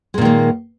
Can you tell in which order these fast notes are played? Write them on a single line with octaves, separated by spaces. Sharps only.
G#3 A#2 D#3 A#3